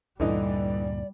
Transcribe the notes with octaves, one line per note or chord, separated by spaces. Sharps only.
D2 G2 A#2 D3 E3 G3 D#4 D5